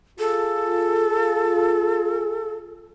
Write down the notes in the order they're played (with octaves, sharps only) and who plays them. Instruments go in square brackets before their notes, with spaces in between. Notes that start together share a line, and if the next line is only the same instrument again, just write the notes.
[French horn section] F4 G#4 [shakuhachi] A4